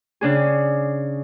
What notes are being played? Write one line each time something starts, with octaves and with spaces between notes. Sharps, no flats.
C#3 D4 G#4